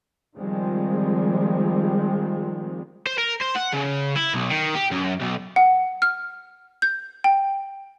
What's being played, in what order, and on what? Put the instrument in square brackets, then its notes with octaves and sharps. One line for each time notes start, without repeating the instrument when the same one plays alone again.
[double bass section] D#3 F3 G3 G#3 C4
[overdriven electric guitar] C5
A#4
C5
F#5
C#3
E4
B1
D#3
G4
F#2
B1
[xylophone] F#5
F6
G6
G5